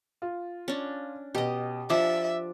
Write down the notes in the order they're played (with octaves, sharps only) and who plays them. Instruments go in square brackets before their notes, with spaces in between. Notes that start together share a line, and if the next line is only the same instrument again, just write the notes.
[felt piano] F4
[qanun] C#4 D4
[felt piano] B2 [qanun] G4 D#5
[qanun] F3 D4 [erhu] E5 [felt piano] D6